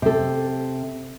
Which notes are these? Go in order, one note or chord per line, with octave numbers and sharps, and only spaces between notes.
C3 A4